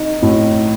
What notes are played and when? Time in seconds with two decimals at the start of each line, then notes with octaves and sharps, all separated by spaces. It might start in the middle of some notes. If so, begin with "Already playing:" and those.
Already playing: D#4
0.22 A2